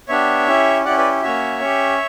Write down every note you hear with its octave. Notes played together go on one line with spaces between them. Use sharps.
B3 D4 G4 C#5 E5
C#4 E4 G4
C#4 E4 G4 D5 F#5
B4 D5
A#3 C#4 F#4 C#5 E5
C#4 G4